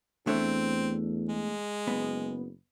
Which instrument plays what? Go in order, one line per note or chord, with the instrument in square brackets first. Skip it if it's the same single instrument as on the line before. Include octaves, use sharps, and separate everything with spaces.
[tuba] E2 [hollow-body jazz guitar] A3 D4 C#5 [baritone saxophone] C4
[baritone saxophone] G#3
[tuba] F#1 [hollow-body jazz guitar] B3